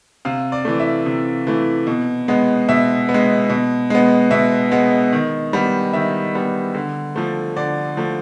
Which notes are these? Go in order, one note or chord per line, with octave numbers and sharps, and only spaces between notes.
C3 F5
D5
E3 A3
E5
C3
E3 A3
B2
G#3 B3
B2 E5
B3
G#3
B2
G#3 B3
B2 E5
G#3 B3
D#3
G3 B3
D#3 E5
G3 B3
D3
F3 A3
D3 D5
F3 A3